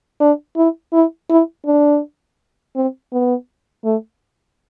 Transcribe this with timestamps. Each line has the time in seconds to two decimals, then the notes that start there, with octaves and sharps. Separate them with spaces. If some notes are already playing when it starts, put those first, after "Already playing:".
0.20 D4
0.56 E4
0.93 E4
1.30 E4
1.66 D4
2.76 C4
3.12 B3
3.84 A3